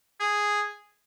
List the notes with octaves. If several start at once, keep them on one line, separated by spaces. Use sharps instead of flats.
G#4